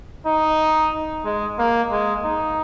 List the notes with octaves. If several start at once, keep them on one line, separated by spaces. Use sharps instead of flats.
D#4
G#3
A#3
G#3
D#4